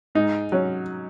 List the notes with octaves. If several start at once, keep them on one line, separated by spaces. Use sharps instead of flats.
G#2 D#4
F#3 C#4